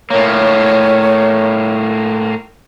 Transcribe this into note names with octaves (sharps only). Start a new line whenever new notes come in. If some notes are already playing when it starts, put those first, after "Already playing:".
A2 A#3 A#4 C#5